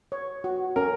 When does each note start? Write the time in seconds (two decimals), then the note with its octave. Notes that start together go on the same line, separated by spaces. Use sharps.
0.12 C#5
0.44 F#4
0.76 C#4 A#4